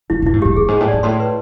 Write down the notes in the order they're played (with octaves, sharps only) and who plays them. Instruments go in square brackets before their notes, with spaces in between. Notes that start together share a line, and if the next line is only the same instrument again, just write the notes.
[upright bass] D3 [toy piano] E4
[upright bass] A#2 [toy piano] E4
[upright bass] G#2
[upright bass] G2 [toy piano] G4
[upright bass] G2 [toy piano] G#4
[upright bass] G#2 [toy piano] G#4
[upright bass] A2
[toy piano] D5
[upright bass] G#2
[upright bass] A2 [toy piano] C6
[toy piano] B4